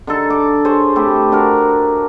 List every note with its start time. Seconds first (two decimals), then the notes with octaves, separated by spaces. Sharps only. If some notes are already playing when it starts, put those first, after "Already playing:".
0.07 D3 D#4 A4
0.30 D6
0.65 G#4 C5 C#5
0.96 C3 A3 E4 G4
1.32 D4 F#4 A#4